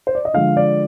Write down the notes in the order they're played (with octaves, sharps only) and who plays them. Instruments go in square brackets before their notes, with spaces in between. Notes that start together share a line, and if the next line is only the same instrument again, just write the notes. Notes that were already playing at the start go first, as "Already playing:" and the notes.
[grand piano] C5
D5
D#5
D3 F3 G#3 F5
D5